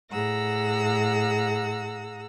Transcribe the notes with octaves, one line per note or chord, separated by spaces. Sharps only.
A2 G#4 F#5 A#5 E6